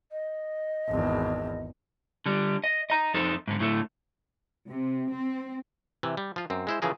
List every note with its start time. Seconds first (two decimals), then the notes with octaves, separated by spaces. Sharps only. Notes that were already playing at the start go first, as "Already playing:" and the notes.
0.12 D#5
0.88 G#1 E2
2.26 D3 G3
2.64 D#5
2.90 D#5 A#5
3.14 F2 D#4 A4 C5
3.48 G#2 D3
3.60 A2 D3 A3
4.68 C3
5.10 C4
6.03 C3 E3
6.17 G3
6.36 F3 F4
6.50 F#2 C4
6.67 G#3 E4 C5
6.82 C#3 E3 F3 G#4 A#4